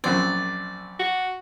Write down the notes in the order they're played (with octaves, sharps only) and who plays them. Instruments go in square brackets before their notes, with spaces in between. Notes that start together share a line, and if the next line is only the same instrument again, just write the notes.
[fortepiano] A#1 F#2 C4 [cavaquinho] D5
[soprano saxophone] F#4